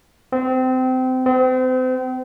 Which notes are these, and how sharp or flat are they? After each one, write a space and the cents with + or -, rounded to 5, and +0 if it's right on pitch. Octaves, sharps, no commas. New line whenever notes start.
C4 -25
C4 -35